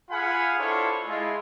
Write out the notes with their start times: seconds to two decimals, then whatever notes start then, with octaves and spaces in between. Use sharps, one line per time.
0.10 F4 G#4 F5 F#5 G#5 B5
0.59 D4 E4 F4 A4 C5 C#5
1.06 G#3 E4 F4